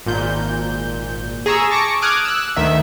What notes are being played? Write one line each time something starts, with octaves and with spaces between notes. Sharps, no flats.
G#1 A#2 G6
G#4 A#5 C#6 E6
A5 C#6 D6 A#6 C#7
D6 D#6 F6 F#6 G#6 D7
E6 F#6
D2 D#3 E5